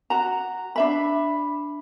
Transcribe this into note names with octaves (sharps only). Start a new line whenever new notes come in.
F#4 A#5
D4 E5 B5